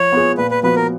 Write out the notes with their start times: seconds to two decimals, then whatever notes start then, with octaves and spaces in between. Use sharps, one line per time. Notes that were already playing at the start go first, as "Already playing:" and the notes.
Already playing: F3 C#5
0.12 B3 F4 G#4
0.37 A#2 B4
0.51 B4
0.63 F3 B3 F#4 B4
0.76 A#4